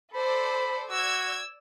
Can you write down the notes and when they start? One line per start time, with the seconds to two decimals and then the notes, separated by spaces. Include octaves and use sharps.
0.14 A4 C5 D5 B5
0.90 F#4 D5 E6 G#6